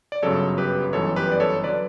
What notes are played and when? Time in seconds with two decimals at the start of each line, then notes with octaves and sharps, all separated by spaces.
0.12 D5
0.23 G1 F#2 C#3 F#3 A4 C#5
0.58 G4 B4
0.93 G1 F#2 E3 A4 C#5
1.16 G4 B4
1.32 D5
1.40 A4 C#5
1.64 D3 F#3 B4 D5